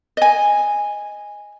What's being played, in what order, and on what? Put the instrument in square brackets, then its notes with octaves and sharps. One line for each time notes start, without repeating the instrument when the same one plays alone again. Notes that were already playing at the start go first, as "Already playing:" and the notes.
[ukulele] D#5 G#5